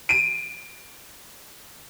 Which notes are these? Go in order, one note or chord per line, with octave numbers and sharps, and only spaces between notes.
D7 D#7